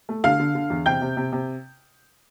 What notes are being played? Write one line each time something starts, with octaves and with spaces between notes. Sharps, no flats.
A3
D3 F5 F6
D3
D3
E2
C3 G5 G6
C3
C3
C3